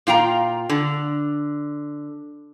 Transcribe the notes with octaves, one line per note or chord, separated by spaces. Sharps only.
A#2 F4 G5 A#5
D3